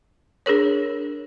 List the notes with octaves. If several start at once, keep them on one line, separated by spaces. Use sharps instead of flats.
D4 G#4 A#4 C#5